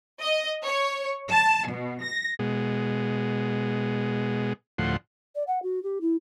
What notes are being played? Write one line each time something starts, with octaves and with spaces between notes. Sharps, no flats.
D#5
C#5
A5
B2
A#6
B2 G#3
D2 A2 F3 F#5 C6
D5
F#5
F#4
G4
E4